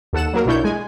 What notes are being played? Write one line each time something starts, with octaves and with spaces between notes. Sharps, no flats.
D#2 A4 F#5 E7
F#3 A#3 A#4
B1 B2 D4 E4 C#5 G6
G#3 G#5